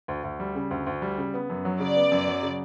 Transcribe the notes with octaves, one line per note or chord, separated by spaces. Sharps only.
D2
D2
G3
C#3
D2
D2
G3
C#3
B3
F#2
F#3
C#3 D5
B3
F#2
F#3
C#3